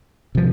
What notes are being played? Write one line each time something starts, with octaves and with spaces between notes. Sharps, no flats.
C3 F3